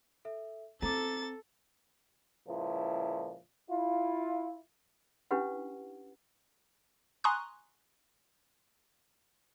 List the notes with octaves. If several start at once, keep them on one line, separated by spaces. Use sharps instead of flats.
A4 E5
C4 A4 A#5 D6 A6
C#2 A#2 F3 E4
E4 F4
C#4 D4 E4 G4 B4 F#5
G#5 A#5 C6 C#6 D#6 F#6